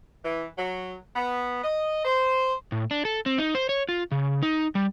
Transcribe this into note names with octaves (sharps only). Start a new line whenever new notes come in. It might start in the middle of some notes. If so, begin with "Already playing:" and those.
E3
F#3
B3
D#5
C5
A2
D4
A4
C4
D#4
C5
C#5
F4
C#3
D#4
G3